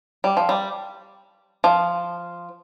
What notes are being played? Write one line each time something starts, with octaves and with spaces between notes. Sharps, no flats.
G3
F3
G3
F3